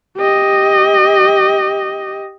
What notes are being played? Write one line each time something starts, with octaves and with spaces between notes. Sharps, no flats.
G4 D#5